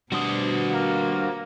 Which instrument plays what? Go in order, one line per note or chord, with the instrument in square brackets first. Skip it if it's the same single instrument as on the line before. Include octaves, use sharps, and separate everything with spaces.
[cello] B2 [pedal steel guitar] G3 D4 D#6 [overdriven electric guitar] F#4 C5
[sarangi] A#3